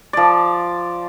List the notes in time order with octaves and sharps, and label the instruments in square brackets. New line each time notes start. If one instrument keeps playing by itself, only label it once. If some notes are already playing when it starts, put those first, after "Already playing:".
[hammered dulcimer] F3 D5